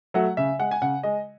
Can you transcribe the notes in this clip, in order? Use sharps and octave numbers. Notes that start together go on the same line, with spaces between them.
F#3 A3 F#5
C#3 E5
G#3 F#5
G#5
C#3 F#5
G#3 D#5